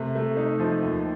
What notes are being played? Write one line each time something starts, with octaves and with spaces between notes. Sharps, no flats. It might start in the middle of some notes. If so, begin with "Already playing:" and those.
Already playing: C3 A3
A3
D#4
F3
D#2